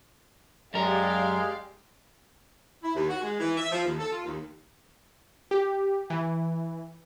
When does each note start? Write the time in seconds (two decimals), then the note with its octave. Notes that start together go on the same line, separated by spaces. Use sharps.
0.74 F#2 G#3 G4 A#4 D5 F5
2.83 E4
2.95 D#2
3.09 F#4
3.22 G#3
3.40 E3
3.58 E5
3.72 F3
3.85 D#2
3.99 A4
4.12 F4
4.24 D#2
5.51 G4
6.10 E3